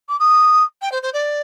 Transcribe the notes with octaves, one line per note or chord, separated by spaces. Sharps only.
D6
D#6
G5
C5
C5
D5